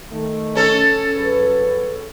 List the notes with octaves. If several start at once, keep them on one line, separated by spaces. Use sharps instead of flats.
D#3 A3
C#4 A4
F#2 G#4 B4